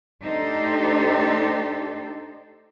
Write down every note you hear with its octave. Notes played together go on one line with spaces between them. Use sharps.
A3 D4 D#4 G4 A4 C5